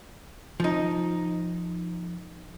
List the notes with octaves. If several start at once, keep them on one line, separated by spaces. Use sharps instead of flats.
F3 D#4